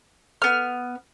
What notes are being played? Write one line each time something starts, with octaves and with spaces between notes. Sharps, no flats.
B3 F6